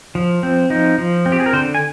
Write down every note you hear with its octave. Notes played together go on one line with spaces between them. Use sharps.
F3
C4
F3 D#4
F3
C4
G4
G#4
A#4
D3 C5
G#5